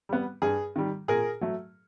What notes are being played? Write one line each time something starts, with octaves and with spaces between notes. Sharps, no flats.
G3 B3
G2 G#4
D#3 G3
A#2 G#4 A#4
F#3 A3